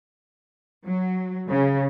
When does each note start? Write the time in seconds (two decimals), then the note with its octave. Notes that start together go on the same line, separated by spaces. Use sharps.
0.86 F#3
1.50 C#3